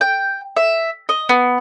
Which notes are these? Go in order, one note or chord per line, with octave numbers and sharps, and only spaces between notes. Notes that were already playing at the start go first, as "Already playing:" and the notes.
G5
E5
D#5
B3